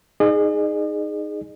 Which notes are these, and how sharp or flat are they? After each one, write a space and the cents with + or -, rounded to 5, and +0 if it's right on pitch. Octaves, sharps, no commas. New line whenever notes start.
D#4 +0 G#4 +0 D#5 -45